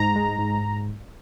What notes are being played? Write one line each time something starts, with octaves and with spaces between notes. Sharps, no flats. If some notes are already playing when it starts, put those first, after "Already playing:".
Already playing: G#2 A#5
G#3
G#2